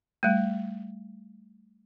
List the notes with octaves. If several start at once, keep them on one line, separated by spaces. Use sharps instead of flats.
G3 A3